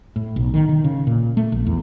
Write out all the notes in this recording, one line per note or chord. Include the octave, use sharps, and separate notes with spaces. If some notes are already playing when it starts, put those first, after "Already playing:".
A2
B1
D#3
D#3
C#3
A#2
A3
A#1
E2